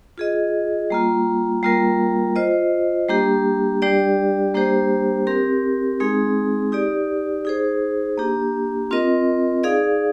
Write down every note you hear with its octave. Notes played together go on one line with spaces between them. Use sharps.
F4 G#4 D#5
G3 A#3 F4
G3 A#3 F4 A#4
F4 C5 D#5
G3 A#3 D4 G4
G3 D4 G4 D5
G3 A#3 D4 G4 C5
C4 G4 A#4
G#3 C4 D#4 G#4
D#4 G4 D5
D#4 G#4 C5
A#3 D4 G4
C4 F4 A#4 D#5
D#4 G#4 D5 F5